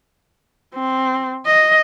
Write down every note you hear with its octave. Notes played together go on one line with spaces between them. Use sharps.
C4
D#5